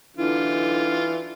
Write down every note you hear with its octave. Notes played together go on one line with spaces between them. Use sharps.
D3 E3 F4